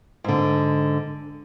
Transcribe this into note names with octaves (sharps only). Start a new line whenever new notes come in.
G#2 D3